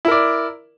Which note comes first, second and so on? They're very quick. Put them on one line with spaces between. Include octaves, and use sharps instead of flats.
E4 A#4 D5